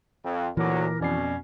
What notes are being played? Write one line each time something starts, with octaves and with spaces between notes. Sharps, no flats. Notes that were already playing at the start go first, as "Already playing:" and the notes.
F2
D2 A#2 E3 F#3 A#4 D6
F2 B2 C#4 D5 C7